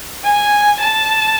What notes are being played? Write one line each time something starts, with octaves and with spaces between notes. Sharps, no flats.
G#5
A5